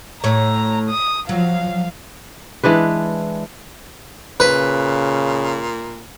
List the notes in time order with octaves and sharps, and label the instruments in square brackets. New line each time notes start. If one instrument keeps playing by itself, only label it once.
[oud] A2 C#5 [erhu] A#5
[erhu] D#6
[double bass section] F3 [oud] F#3 [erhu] F5
[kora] E3 G#3 D4 B4
[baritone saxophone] A#2 [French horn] C#3 [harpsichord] B4